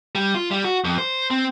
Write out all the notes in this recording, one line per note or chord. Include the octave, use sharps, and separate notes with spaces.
G3
F4
G3
F#4
F2
C5
C4